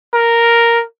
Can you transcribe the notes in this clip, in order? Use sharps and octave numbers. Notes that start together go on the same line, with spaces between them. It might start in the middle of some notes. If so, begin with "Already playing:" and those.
A#4